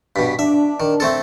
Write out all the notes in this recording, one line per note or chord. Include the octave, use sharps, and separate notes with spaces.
G2 B2 B6
D4 E5
D#3
A3 C4 A4